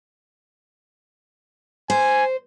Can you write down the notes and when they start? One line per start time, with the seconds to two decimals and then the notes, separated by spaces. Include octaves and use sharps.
1.90 C5 G#5